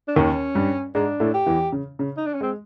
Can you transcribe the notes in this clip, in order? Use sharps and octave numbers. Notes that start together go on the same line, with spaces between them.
D4
D#2 D#3 C#4
G2 G3
G#2 G#3 D4
A2 A3
G4
E2 E3
C#3
C#3
D#4
D4
C#4
G#3 C4